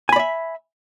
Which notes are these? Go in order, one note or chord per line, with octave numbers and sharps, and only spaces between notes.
D5 E5 G#5 B5